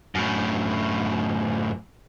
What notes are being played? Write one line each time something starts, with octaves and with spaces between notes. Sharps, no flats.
F#2 A2